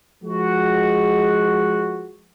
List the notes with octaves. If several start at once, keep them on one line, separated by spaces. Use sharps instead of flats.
F3 G#3 F#4